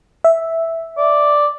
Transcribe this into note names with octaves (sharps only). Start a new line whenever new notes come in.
E5
D5